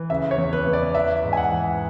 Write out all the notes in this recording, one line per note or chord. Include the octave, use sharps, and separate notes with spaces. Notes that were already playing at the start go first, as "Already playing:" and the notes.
Already playing: E3
C#3 E5
C#5
E2
B4
E2
D5
E3 E5
G#2
G#5
F#5
E3